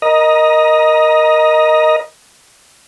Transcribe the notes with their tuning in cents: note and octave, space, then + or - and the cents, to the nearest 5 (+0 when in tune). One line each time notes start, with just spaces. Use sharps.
A#4 +0 D#5 +0 A#5 +25